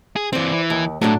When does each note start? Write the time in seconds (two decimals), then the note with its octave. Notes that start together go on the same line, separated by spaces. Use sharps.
0.16 G#4
0.33 E3 C4 C5 D5
0.52 E3
0.70 D#2
1.01 A2 F#3 A3 D4